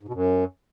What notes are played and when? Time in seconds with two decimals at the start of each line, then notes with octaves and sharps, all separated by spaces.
0.03 G#2
0.08 B2
0.14 F#2